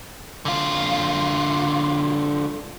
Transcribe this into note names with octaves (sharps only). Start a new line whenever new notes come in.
D3 F4